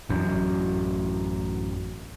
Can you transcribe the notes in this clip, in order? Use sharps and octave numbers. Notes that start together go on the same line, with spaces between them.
A1 F#2